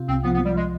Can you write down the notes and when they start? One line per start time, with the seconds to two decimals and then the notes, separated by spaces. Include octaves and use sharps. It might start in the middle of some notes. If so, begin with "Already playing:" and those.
Already playing: C3 F4
0.08 C2 C4
0.23 F3 B3
0.35 B3
0.41 F3 G3
0.57 G#3